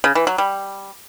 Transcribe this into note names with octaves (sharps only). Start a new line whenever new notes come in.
C#3
E3
F#3
G3